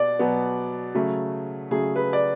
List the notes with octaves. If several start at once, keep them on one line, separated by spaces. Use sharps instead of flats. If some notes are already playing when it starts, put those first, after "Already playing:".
Already playing: B2 B3 D5
B2 F#3 B3
C#3 F#3 A3
C#3 F#3 A3 G#4
B4
D5